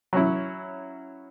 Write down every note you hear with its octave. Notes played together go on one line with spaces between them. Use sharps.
F#3 C#4 E4